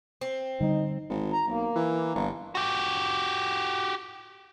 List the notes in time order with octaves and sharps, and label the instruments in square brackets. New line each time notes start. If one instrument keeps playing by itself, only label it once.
[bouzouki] C4
[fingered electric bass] D3 G3 [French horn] D#4
[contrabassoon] G#1
[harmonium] A#5
[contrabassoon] B1 [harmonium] A#3
[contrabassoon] E3
G1
[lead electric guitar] F#4 G4